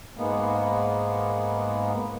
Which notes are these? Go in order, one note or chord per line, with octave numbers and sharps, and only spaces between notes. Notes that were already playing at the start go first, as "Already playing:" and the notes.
G#2 G#3 A#3 B3